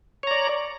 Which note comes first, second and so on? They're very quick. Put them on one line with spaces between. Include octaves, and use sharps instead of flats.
C#5 A#5 D5